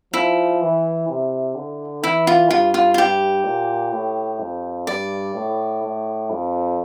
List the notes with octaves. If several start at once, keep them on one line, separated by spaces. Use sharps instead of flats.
F3 E4
E3
C3
D3
E3 E4
F4
G2 F4
F4
F4
G2 G4
A#2
A2
F2
G2 D5
A2
A2
F2